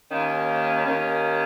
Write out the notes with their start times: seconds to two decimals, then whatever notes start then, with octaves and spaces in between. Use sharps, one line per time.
0.11 D#2 D#3 A#3 C#4
0.85 D#2 D#3 A#3 C#4